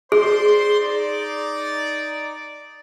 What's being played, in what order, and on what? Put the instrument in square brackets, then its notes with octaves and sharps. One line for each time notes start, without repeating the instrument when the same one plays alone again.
[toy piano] G#4 [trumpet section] C5 D5 C6
[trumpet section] D#4 D5